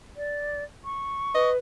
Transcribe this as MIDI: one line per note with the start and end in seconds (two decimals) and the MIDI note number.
0.17 0.64 74
0.85 1.50 85
1.35 1.57 71
1.35 1.51 75